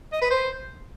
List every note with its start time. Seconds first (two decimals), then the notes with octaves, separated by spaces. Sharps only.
0.12 D#5
0.21 B4
0.30 C5